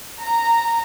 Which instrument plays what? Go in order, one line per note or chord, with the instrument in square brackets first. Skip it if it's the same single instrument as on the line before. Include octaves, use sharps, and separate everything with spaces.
[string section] A#5